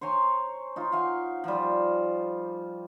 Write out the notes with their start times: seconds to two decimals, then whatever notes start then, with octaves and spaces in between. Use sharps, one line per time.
0.01 C5 C#5 G#5 A#5
0.76 D#4 F4
0.92 F5 F#5 G#5
1.44 F3 G3